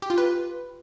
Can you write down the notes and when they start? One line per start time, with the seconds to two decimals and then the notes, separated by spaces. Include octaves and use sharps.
0.02 G4
0.10 F4
0.18 B4